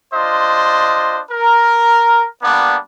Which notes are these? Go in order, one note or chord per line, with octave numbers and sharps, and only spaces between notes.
D4 F4 C5 D#5
A#4
G3 A#3 B3 D4